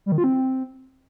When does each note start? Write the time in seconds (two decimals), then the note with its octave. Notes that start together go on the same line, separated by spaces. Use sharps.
0.06 G3
0.12 D#3
0.18 F4
0.24 C4